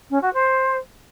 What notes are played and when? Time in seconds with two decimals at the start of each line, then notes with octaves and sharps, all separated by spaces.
0.10 C#4
0.21 F#4
0.33 C5